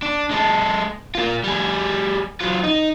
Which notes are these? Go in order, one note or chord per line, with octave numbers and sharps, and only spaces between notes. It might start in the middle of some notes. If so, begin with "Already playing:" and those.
D4
G#3 A4
A#3 F4
G3 G#4
F#3 F4
D#4